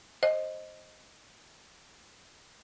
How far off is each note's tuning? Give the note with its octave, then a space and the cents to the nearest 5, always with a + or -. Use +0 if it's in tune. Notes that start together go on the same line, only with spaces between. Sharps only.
C5 +15 D#5 +0